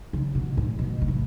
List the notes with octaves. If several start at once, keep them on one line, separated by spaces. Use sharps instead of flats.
C#3
B2
A2
B2
B2
A2